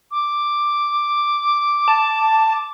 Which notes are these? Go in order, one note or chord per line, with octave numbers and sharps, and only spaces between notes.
D6
A5